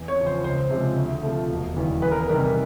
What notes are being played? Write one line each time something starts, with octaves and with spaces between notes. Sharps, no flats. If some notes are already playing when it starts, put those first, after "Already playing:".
Already playing: E2
C#5
C#3 F3
C5
C#2 C5
C3 F3 G#3
D2
C3 F3 A3
E1
D#2 C#3 E3 G3
E2 B4
A#4
C3 D#3 G3 A#4